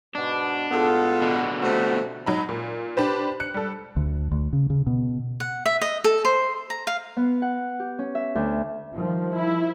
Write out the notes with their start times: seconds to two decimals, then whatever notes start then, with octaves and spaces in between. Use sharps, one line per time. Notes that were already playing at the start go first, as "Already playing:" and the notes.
0.15 G#2 B2 D4
0.71 A2 G#3 B3 F4 A4
1.22 B2 D3
1.62 C3 F3 A3 F#4
2.26 F#3 D#4 B5
2.49 A#2
2.97 D4 G4 B4 C5
3.40 F#6 C#7
3.54 G3 A4
3.97 D2
4.31 D2
4.53 C#3
4.70 C#3
4.87 B2
5.40 F#5
5.66 E5
5.81 D#5
6.04 A4
6.25 C5
6.70 A#5
6.87 F5
7.17 B3
7.42 F#5
7.80 G4
7.99 C#4
8.15 E5
8.35 D2
8.93 D#3 F3 G3
9.35 E4